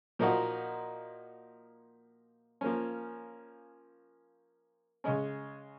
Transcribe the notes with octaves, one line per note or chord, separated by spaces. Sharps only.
A#2 F3 A#3 D#4 F#4
F3 A#3 C#4
C#3 G#3 C#4